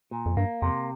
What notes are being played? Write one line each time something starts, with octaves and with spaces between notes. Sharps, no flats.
A#2
F2
G2 A#3
F2 C3